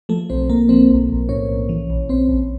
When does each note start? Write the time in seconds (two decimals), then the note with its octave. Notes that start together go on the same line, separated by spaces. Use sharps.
0.09 F3 A3 A4
0.30 B1 C4 C5
0.50 B1 A#3 A#4
0.69 F3 C4 C5
0.90 B1
1.10 B1
1.29 A2 C#4 C#5
1.49 B1
1.69 E3
1.90 A#1
2.09 A#1 C4 C5
2.29 A#1